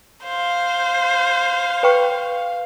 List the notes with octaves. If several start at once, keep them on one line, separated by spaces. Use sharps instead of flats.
C5 F5
B4 G5 C#6